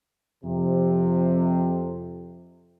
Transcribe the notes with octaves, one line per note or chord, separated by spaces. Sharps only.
F2 C3